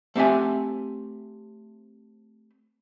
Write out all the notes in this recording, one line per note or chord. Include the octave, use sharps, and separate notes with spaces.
A3 C4 G4 E5 G#5